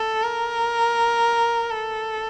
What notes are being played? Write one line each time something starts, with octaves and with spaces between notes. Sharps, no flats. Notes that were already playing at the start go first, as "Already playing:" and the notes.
Already playing: A4
A#4
A4